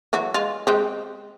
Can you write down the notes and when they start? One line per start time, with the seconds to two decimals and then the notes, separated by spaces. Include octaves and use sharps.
0.13 E3 F#3 F#4
0.34 G#3 F4
0.67 G#3 C4 G4